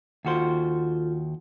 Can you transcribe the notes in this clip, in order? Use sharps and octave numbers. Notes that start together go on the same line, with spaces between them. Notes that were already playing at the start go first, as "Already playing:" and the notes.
D#2 F4 F#4 A4 C5